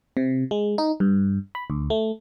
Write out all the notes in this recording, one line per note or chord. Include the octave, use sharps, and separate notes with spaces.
C3
G#3
D#4
G2
B5
D2
A3